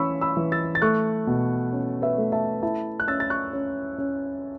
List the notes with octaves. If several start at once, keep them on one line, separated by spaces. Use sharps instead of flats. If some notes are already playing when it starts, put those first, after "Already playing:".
Already playing: E3 C#4 B5 C#6 E6
B5 E6
E3
E6 A6
A6
A3 C#6 F#6
B2
C#4
B4 E5
A3
E5 A5
E4 E5 A5
F#6
C#4 E6 A6
A6
C#6 F#6
C#4
C#4